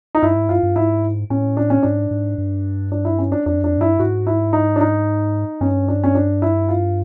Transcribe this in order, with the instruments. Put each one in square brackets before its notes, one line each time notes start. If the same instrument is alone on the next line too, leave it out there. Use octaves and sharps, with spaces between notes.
[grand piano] D#4
[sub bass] G2 [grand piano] E4
[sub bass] G#2
[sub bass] G2 [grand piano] F4
[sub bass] G2
[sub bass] G#2 [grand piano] E4
[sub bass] A2 [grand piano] C#4
[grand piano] D4
C#4
[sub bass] G#2 [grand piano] D4
[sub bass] G#2
G2
[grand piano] D4
E4
C#4
D4
[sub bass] F2 [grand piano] D4
[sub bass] F#2
[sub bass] F2 [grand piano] D4
[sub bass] G#2
[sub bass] G2 [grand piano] E4
[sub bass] G#2 [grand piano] F#4
[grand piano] E4
D#4
D4
D#4
[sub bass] G2 [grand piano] C#4
[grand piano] D4
C#4
D4
E4
F4